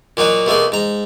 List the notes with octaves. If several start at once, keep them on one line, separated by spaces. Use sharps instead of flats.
A#2 F#3 D#4 F#4
B2 A3 A#3 G#4
G#2 A#5